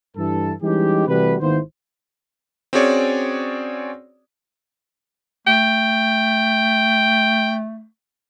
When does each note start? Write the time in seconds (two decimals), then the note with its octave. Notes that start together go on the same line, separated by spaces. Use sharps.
0.17 G2 E3 A4
0.63 E3 G3 G#3 C#4 D#4 G4
1.07 C3 E3 G3 A3 F#4 B4
1.41 G#1 D#3 A#3 B3 E4 C5
2.73 C4 C#4 F#4 G#4 C#5 D5
5.47 A3 G5